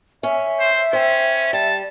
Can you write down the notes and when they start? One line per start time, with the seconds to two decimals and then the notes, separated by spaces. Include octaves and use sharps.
0.23 C#4 E5
0.60 C5
0.93 C#4 C5 G5
1.53 G3 A5